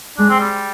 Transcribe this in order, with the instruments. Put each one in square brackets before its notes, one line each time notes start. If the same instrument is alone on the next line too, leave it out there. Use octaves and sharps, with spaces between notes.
[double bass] G#3 [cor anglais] D4
[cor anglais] C4
G3